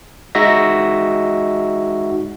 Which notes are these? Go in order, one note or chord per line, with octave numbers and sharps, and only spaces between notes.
G#3 D#4 F#4 E5 A#6